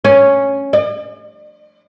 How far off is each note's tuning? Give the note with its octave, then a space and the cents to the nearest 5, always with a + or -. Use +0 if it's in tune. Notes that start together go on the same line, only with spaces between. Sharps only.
C#4 +0
D5 +45